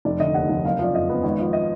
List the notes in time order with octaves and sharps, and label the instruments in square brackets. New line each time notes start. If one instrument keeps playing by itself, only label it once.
[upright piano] F1 D5
D3 D#5
D#2 F#5
F1
F#1 F5
F3 D5
F2 D#5
B3
G#1
F3
D#5